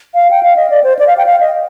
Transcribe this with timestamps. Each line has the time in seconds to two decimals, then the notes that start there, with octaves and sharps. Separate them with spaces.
0.14 F5
0.31 G5
0.43 F5
0.56 D#5
0.70 D5
0.84 C5
0.99 D5
1.07 F5
1.18 G5
1.26 F5
1.40 D#5